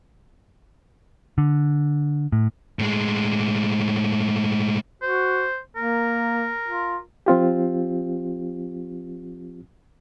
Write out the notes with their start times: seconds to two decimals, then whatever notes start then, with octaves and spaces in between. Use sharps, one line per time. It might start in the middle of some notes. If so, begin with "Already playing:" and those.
1.38 D3
2.32 A2
2.79 A2 G#3
5.02 F#4 C5
5.76 A#3 A#4
6.68 F4
7.26 F3 C4 F4 G4